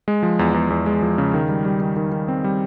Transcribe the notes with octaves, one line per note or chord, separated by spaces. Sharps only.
G#3
F3
E2
E2
E2
G#3
F3
C#3
D#3
G3
G3
D#3
D#3
D#3
C4
G3